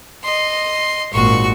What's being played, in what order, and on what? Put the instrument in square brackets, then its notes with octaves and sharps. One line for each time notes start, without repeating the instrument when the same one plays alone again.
[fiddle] D#5 C6
[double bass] G#1 A#2 [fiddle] F#4 C#6